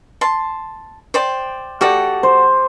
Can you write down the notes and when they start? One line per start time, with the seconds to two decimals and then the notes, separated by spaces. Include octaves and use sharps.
0.21 A5 C6
1.14 C5 D5 G5
1.81 F#4 G4 A4 D5
2.23 C5